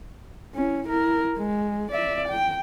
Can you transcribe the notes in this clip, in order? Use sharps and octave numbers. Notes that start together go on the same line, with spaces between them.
C#4 E4
E4 A#4
G#3
D5 E5
G5